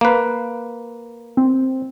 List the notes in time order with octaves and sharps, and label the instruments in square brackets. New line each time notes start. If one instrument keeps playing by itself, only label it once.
[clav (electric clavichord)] A#3 B4
[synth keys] C4